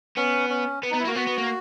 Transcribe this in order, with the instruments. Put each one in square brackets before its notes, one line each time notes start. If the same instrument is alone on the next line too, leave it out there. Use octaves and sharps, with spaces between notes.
[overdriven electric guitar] B3 [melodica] C#4
[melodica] C#4
[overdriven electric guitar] B3
[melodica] D#4
[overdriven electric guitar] B3
[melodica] E4
[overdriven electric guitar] A#3 [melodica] F#4
[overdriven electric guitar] B3 [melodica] F#4
[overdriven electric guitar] B3
A#3